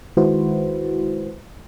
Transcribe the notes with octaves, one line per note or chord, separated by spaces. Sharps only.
D#3 G#3 E4 F#4 B4 C5